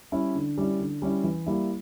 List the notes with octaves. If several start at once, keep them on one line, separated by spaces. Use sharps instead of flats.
G3 C#4 E4
D3
G3 C#4 E4
D3
G3 C#4 E4
E3
G3 A#3 E4